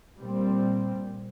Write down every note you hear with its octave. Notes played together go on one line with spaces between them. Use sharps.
A#2 G3 C4